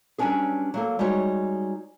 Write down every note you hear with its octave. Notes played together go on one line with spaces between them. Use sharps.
F#3 G3 B3 C#4 D4 G#4
F#3 A#3 A4
G3 G#3 D#4 F#4 C#5